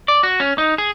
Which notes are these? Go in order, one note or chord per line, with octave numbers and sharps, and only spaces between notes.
D5
F#4
C#4
D#4
G#4